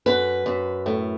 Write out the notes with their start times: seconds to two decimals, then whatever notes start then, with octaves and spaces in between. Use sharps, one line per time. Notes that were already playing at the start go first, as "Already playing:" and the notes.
0.06 F#2 B4
0.46 F#2
0.86 A2